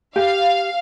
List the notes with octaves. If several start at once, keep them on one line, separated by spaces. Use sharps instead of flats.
G4 F5